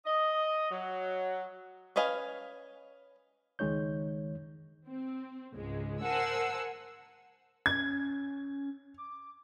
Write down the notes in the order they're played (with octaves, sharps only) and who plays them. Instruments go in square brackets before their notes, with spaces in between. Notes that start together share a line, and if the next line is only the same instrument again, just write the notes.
[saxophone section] D#5
F#3
[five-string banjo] C#4 B4 D#5 F5 G#5
[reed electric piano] C#2 D#3 G#3 D#4 C#5 G6
[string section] C4
C#2 G#2 G#3
A#4 C5 F#5 G#5 A5 E6
[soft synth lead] C#4 [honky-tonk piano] G#6
[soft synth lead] D6